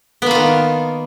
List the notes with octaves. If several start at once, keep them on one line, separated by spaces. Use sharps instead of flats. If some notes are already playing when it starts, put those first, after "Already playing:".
D#3 A#3 B3 F4